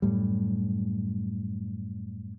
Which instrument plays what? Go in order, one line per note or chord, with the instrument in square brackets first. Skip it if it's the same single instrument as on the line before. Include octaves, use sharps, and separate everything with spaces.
[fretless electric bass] F#2 A2 G3